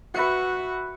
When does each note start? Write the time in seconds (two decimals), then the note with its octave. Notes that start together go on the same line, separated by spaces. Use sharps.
0.14 F#4 B4 E5 F#5